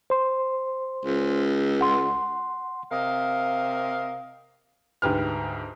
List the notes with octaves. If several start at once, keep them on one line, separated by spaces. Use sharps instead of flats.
C5 C6
C#2
F#5 C6
C3 A#4 D#5 F5
D2 G#2 G4 B4 F6